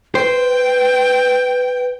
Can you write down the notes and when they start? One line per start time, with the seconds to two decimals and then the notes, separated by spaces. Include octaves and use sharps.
0.15 B4 C5 G5